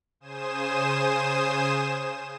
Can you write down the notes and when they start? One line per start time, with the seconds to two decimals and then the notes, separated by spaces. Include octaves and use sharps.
0.20 C#3 C5 G#5 D#6 E7